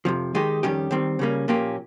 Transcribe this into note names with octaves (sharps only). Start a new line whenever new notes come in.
F2 C3 F3
D#3 G#3 D#4 G4
F2 D#3 G3 C#4 G4
D#3 G3 C4
C#3 G3 A#3 C#4
A#2 F3 A#3 C#4 G4